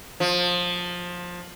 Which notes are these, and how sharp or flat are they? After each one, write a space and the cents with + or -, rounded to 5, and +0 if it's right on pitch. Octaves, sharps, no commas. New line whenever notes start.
F3 +20